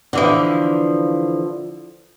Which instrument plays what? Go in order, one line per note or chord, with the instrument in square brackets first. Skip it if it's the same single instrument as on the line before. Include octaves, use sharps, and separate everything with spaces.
[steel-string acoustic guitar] D3 E3 F3